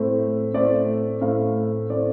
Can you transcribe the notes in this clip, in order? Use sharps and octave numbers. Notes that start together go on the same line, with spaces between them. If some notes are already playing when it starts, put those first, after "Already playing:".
Already playing: A2 A3 C4
A2 A3 C4 D5
A2 A3 C4 F5
A2 A3 C4 D5